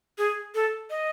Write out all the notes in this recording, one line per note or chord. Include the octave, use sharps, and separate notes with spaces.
G#4
A4
D#5